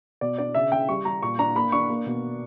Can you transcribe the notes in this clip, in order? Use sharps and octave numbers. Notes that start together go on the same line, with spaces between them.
B2 D5
D4 D5
C#3 E5
C#3 G5
G3 C#6
G3 A#5
A#2 C#6
D4 A#5
A#3 B5
D4 C#6
A#3
B2